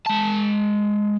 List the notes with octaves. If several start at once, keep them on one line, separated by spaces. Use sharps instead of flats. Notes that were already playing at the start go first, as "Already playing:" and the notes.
G#3 A5